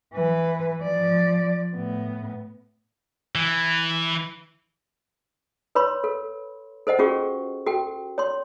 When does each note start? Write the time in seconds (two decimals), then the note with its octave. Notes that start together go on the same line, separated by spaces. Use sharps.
0.14 E3 B4
0.82 F3 D5
1.75 A2 B3
3.35 E3
5.75 B4 C#5 B5 C6
6.04 A4
6.87 A4 C5 D#5 F#5
6.99 C#4 F4 F#4 G#4 C#6
7.66 F#4 A4 G5
8.18 C#5 C6